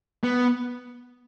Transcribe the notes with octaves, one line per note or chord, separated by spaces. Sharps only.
B3